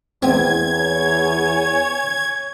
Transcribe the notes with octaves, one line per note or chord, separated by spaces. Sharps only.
E2 B3 C4 G#6
C#5 G#5